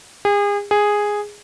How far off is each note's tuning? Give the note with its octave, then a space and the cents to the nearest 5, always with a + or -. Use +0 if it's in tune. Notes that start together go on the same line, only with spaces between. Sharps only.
G#4 -35
G#4 -5